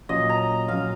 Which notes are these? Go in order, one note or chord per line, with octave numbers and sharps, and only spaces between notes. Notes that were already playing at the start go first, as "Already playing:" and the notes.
A#2 F#3 C#4 D#5
A#5
A#2 F#3 C#4 F5